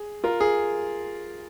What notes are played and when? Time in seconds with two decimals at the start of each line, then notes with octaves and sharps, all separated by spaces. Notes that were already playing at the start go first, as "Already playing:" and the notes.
Already playing: G#4
0.24 F4 A#4
0.40 G#4